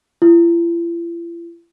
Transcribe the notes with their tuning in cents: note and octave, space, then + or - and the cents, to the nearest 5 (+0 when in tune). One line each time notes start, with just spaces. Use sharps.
E4 +45